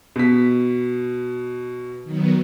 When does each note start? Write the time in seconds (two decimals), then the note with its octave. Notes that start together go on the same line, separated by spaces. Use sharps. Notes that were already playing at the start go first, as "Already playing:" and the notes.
0.16 B2 B6
2.04 D#3 F#3 B3